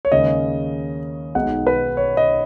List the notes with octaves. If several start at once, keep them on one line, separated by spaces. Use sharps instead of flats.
C#5
D#2 C#3 G#3 C#4 D#5
B1 B2 G#3 D#4 F#5
B4
C#5
D#5